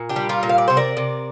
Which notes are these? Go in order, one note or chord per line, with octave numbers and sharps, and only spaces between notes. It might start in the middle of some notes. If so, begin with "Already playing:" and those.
Already playing: A#2
D4 G4
G3
F4 A#4
A#2
F5
D5
C3 C5
A#4 D5
C3